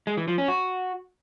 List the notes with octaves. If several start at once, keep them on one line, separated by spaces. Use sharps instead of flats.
G#3
E3
F3
C#4
F#4